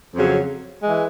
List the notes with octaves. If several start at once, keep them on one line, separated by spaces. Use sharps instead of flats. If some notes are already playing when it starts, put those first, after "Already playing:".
F2 C#3 F#3
E3 G#3